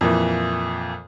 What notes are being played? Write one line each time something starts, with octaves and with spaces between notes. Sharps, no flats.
F2 A#2 E3